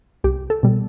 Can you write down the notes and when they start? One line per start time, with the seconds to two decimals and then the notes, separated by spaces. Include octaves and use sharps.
0.24 C2 G4
0.50 A4
0.63 B2 G3